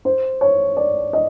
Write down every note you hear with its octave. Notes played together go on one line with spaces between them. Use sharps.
C5
C#5
D5
D#5